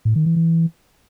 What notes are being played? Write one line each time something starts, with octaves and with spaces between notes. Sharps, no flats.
A2
D#3
E3
E3